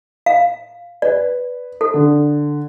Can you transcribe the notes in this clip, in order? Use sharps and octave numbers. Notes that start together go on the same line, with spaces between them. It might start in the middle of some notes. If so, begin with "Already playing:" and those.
F5
B4 D5
A4
D3